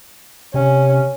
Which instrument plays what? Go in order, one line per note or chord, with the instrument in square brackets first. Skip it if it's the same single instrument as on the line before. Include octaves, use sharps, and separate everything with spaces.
[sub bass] C3 [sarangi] C#4